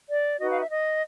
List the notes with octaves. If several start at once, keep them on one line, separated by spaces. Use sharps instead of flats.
D5
D#4 F#4 B4 D#5
F5
E5
D#5